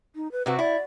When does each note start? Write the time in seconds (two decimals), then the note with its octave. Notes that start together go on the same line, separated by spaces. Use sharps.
0.16 D#4
0.32 B4
0.46 C3 C4 F#4 B4
0.59 E4 D5